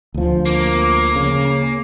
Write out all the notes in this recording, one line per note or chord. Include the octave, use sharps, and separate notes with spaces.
D2 F3
A#3
C#3